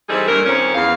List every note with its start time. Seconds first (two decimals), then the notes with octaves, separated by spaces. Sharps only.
0.09 E3 G3 C4 D#4 G#4 A4
0.28 G2 A#2 A3 A#4
0.45 F2 D#3 F3 C#4
0.75 E2 F5